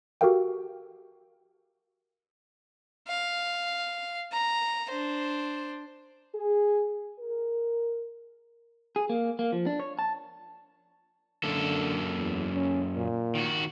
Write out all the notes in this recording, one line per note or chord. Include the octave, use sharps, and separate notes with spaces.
F#4 G4 A4 A#4 F5 G5
F5
A#5
D4 C5
G#4
A#4
G#4
A#3
A#3
F3
D4
C#5
A5
F#2 D3 A#3 A4
E2
C#4
A#2
D#3 F#4